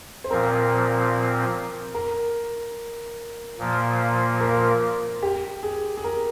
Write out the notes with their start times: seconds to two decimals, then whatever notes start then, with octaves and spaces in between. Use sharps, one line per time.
0.24 C5
0.30 A#2 F3 C4 A#4
1.95 A#4
3.58 A#2 F3 A#3
4.40 A#4
5.23 G4
5.63 G#4
5.97 G#4
6.04 A#4